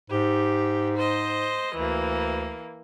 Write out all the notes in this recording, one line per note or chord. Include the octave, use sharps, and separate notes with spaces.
G#2 G4
C5 D#5
D2 E3 A#3